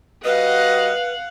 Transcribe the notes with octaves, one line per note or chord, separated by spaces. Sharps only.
G3 F#4 B4 D#5 F5 F#5